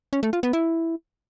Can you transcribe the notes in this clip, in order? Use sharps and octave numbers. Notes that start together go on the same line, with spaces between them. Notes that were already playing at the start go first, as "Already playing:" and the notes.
C#4
A3
F4
B3
E4